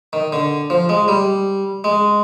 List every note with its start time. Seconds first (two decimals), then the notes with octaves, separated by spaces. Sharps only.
0.13 D#3
0.33 D3
0.70 F3
0.89 G#3
1.08 G3
1.84 G#3